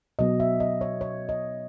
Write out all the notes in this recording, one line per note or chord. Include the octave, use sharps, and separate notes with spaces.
B2 F#3 B3 D#5
E5
D#5
C#5
C#5
D#5